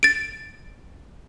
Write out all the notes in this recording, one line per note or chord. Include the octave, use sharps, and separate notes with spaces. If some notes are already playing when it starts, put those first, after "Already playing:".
A6 D7